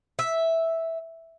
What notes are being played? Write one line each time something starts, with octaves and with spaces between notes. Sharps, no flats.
E5